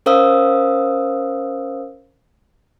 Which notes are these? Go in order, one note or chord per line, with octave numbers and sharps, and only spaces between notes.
C#4 A#4 C5 F5 D#6 E6